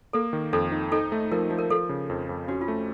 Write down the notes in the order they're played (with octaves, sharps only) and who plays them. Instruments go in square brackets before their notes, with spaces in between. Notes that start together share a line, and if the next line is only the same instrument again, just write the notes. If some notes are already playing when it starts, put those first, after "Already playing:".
[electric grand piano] A#3 [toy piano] A4
[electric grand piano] D#3
[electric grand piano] F2 [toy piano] A4
[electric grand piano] D#4
[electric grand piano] D#4 [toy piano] A4
[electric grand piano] A3
[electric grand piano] F3 [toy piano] A#4
[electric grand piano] F3
[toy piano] A#4
[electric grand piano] F3 [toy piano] A4
[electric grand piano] C#3
F2
F2
[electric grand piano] C#4 [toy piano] F#4
[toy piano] F4
[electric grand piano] A3